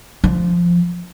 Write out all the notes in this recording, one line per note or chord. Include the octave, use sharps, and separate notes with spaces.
F3